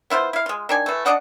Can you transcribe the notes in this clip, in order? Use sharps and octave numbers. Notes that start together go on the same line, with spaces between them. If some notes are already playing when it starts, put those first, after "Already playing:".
B3 E4 F4 C5
E4 F5
G#3 F4
D#3 D4 G#5
E3 A3
D4 D5 D#5 F#5